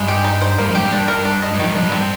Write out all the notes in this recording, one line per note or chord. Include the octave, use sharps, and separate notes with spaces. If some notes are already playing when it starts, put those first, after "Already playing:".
Already playing: G2 G#3
G4
D#4
C5
G2 A#3
F2
G#2 G4
G2
D4
A#4
D4
D#5
G2
F2 D#3
G2
F2 D4
G2
C4